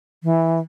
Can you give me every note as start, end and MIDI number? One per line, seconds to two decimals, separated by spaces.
0.23 0.60 52